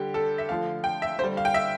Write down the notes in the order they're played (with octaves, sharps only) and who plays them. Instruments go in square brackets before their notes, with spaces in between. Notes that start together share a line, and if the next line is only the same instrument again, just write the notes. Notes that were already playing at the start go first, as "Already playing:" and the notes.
Already playing: [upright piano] D3 G3 G4
A4
E5
D3 F3 A3 F5
G5
E5
D3 C5
G3
F5
G5
E5